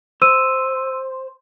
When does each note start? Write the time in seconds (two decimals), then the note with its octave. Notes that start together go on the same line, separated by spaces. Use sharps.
0.22 C5 E6 D#7